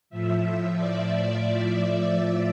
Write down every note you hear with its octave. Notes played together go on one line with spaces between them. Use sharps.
A2 F3 E5
D5